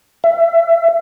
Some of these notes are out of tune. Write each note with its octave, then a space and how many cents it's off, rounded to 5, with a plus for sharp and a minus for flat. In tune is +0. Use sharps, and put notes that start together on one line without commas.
E5 +25